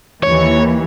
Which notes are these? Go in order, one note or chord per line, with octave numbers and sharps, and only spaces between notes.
D#2 E3 C#5